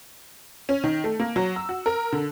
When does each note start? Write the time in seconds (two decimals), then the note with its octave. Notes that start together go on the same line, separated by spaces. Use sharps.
0.69 C#4
0.84 D#3
1.04 A3
1.20 A#3
1.36 F#3
1.56 E6
1.69 F#4
1.86 A#4
2.12 D3